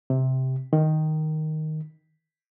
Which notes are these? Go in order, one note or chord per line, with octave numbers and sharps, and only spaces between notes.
C3
D#3